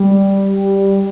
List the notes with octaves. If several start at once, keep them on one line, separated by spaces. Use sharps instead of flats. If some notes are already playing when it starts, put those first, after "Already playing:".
Already playing: G3